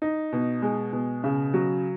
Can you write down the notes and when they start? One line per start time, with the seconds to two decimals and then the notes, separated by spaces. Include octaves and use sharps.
0.02 D#4
0.32 B2
0.62 G#3
0.93 B2
1.24 C#3
1.54 F#3